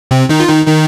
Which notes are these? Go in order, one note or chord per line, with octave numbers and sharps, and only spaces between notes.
C3 C4
D#3 D#4
F4
D#3 D#4
D#3 D#4